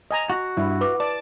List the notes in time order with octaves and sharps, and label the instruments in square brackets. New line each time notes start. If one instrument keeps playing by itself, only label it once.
[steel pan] D#5 G#5 A#5
[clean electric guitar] F#4
[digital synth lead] G2 [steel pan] E4
[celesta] B4 D6
[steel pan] D5 [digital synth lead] A5